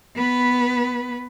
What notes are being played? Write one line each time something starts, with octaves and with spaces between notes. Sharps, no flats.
B3 B4